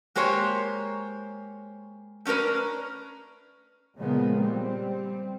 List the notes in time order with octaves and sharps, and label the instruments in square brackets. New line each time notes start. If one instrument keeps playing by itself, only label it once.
[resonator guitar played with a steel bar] G#3 A#3 G4 C5 C#5
A3 C#4 D4 A#4 B4
[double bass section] A#2 C#3 F3 G#3 A#3 B3
G3 C4